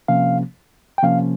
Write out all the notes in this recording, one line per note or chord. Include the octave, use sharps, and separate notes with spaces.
C3 F3 A#3 C#4 F5
G5
C3 F3 A#3 C#4 F5